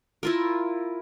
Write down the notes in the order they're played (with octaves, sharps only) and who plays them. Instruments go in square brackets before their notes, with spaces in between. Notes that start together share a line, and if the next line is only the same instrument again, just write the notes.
[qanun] E4 F4 A#4